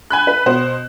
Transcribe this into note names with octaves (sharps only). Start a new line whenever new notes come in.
G#5 B5 F#6
B4
B2 C5